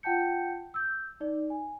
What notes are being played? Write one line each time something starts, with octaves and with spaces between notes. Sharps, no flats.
F4 F#5 G5 A5 G6 C#7
E6 G6
D#4 D5
G#5